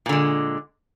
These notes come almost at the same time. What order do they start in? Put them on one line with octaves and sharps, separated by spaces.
A#2 D3 G#3